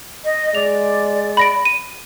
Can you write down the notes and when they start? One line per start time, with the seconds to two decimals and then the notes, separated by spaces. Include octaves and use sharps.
0.25 D#5
0.55 G#3 D5 F7
1.37 B5 A#6 D7
1.65 D#7